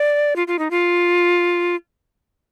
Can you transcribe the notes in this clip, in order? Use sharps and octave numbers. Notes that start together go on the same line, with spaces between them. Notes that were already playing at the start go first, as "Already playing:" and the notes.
Already playing: D5
F4
F4
D#4
F4